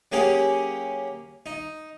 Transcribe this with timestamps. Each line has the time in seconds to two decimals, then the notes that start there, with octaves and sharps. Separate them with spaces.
0.12 F#3 A#3 C#4 G4 G#4 F5
1.46 D#4